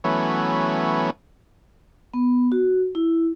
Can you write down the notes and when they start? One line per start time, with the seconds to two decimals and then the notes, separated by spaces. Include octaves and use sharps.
0.04 E3 F#3 A3 B3 C#4
2.14 B3
2.52 F#4
2.95 E4